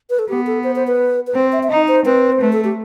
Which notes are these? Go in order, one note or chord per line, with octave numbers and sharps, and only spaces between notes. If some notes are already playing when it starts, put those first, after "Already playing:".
B4
A4
B3 G4
A4
C5
C5
B4
B4
C4 C5
E5
E5
D#4 D#5
C5
C4 B4
C5
A3 B4
A4
G4